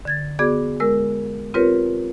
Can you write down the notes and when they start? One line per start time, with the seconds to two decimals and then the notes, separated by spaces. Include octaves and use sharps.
0.05 D3 G#6 A6
0.39 B3 F#4 G#4 D5 D6 G#6
0.80 G#3 A#4 E6
1.54 C4 F4 G4 A#4 B4 C#5